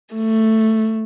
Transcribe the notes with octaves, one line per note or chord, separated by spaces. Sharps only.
A3